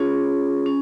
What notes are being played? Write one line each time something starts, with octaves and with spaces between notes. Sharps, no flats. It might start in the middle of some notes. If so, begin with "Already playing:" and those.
Already playing: C#4 F4 G#4 C#5
C#4